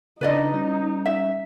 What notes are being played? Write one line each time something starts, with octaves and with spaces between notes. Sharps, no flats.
C#3 D4 D#4 B4 D5 D#5
G3 C#4
E5